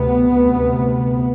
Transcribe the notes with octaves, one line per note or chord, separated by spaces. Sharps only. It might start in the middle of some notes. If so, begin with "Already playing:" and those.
Already playing: D2 C3 B3
D2 C3